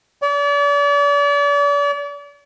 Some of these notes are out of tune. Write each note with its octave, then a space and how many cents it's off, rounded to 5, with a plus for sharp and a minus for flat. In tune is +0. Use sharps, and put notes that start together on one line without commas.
D5 -40